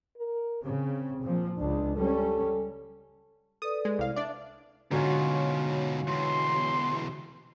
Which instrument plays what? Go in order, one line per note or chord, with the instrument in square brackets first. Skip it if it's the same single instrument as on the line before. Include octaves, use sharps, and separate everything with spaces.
[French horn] A#4
[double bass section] C#3 [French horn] C4
[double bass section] A#2 F3
[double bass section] C#2 [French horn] D4
[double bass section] G3 C#4 [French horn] A4
[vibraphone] A4 B4 D5 [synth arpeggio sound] D#6
[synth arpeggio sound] G#3
C2 F5
[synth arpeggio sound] D4 D5 [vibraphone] E5
[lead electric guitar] G#2 B2 [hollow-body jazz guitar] D3 [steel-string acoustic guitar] F#3 C#4 F4
[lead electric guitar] E2 B2 [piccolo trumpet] C6